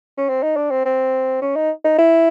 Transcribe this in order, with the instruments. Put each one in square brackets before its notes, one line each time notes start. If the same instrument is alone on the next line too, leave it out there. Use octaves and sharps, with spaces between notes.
[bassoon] C#4
C4
D#4
D4
C4
C4
C#4
D#4
D#4
E4